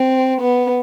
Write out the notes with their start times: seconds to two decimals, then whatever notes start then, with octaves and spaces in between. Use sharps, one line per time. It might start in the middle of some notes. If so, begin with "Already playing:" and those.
Already playing: C4
0.41 B3